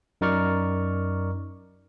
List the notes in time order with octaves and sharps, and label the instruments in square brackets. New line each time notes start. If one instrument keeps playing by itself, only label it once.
[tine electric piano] F#2 D#4 A#4 D5 C#6 F6